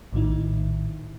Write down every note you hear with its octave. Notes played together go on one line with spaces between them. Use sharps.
A#1 A2 D#3 D#4 E4